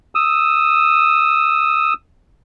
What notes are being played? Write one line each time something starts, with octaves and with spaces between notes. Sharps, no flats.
D#6 E6